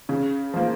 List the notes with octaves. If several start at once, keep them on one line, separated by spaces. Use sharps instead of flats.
C#3
F3 A#3